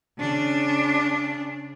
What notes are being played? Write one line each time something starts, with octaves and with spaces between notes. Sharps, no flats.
C#3 D4